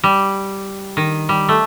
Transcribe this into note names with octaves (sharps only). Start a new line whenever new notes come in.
G3
D#3
G3
A3